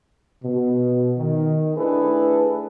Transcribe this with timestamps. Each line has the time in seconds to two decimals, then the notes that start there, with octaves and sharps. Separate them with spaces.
0.42 B2
1.18 D#3
1.76 A3 D4 E4 G#4 A4 B4